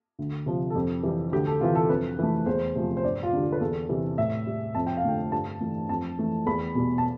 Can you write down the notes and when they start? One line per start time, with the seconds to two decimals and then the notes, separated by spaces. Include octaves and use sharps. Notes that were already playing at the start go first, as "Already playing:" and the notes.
0.19 D2
0.46 C3 F3
0.70 A4
0.75 F2 G4
1.03 E3 G3
1.32 D2 G4
1.47 A4
1.61 C3 E3 F4
1.75 A4
1.89 F2 B4
2.19 E3 A3
2.46 E2 C5
2.75 C3 F3 A3
2.97 C5
3.04 G2 D5
3.23 F4
3.33 D3 G3
3.42 G4
3.52 B4
3.61 E2 A4
3.89 C3 E3 G3
4.18 A2 E5
4.47 G3
4.75 F2 A5
4.86 G5
4.97 F5
5.04 D3 F3 A3 G5
5.32 G2 A5
5.61 E3 A3
5.89 F2 A5
6.19 E3 A3
6.46 E2 B5
6.75 B2 G3
6.98 A5